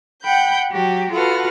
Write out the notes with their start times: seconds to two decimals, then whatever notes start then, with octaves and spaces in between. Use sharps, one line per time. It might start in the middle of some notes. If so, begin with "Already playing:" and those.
0.22 F#5 G5 B5 G6
0.71 F#3 F#4 G4
1.12 F4 F#4 A4 B4 F#5 F6